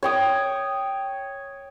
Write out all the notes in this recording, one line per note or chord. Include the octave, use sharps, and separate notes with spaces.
C#5 G5 D#6